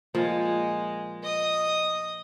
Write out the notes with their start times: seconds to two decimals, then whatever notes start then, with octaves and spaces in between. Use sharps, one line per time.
0.15 A#2 F3 G#3
1.23 D#5 D#6